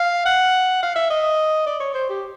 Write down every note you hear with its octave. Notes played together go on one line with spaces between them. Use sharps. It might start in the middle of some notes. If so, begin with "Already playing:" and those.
Already playing: F5
F#5
F5
E5
D#5
D5
C#5
C5
G4